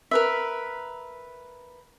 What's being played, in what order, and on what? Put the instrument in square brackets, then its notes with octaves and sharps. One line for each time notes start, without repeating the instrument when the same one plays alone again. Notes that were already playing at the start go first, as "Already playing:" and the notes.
[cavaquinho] A#4 B4 E5